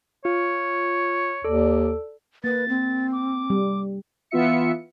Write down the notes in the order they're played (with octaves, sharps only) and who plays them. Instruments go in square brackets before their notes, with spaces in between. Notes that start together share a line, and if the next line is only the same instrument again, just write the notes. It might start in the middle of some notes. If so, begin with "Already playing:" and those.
[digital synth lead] F4 [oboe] C#5
[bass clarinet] D#2 [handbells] A4 [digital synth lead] D5
[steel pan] A#3 [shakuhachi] B4 [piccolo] A6
[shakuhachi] C4
[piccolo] D6
[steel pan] G3
[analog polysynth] E3 B3 F4 E5 C#7